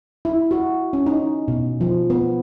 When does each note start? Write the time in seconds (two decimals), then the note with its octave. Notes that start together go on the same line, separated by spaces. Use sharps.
0.25 E4
0.51 F#4
0.93 C#4
1.06 D#4
1.48 B2
1.81 F3
2.10 B3